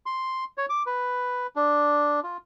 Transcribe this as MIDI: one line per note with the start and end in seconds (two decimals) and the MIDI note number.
0.06 0.44 84
0.58 0.66 73
0.70 0.83 86
0.86 1.47 71
1.56 2.20 62
2.24 2.37 65